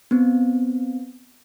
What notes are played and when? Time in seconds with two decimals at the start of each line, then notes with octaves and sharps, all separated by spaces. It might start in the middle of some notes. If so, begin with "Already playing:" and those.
0.11 B3 C4